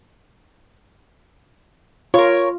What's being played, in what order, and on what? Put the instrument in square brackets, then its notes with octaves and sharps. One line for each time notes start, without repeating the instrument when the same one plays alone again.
[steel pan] F4 [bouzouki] A#4 C#5